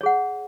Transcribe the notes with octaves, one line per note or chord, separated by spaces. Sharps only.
G#4 C#5 F#5